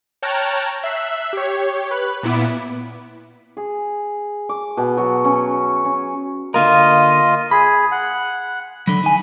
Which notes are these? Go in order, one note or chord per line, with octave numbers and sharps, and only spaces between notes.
C#5 G5 A5 A#5 F6 F#6
E5 F#6 C7
G4 C#5
B4 F#6
A#2 B3 E4 B5 D6
G#4
D6
B2
F#3
C#4
C#4
D3 A#3 F4 A#4 D#5
G#4 B5
F#5
D3 F#3 B5
D#4 G#5